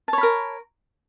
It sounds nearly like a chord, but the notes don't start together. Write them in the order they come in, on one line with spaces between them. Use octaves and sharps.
A5 C#5 B5 A#4